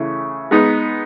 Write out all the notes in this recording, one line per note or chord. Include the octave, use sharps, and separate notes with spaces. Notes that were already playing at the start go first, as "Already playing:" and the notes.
Already playing: C#3 E3 A3
G#3 B3 D#4